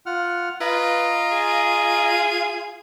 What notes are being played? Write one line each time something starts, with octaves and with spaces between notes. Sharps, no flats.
F4 F#5 F6
F4 B4 D#5 A#5
G#4